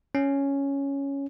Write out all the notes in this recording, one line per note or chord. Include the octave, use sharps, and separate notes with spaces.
C#4